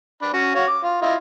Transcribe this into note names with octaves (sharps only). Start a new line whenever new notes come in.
D4 B5
C#4 F#4
F#4 C#5 F5
D6
F4
E4 F4 D#5